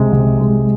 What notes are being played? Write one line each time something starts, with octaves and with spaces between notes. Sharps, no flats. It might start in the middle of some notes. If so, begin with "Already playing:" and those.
Already playing: C3 G#3
C3
G#3